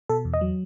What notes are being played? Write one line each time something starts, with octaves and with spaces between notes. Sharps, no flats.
B2 A4
E2
D#5
F#3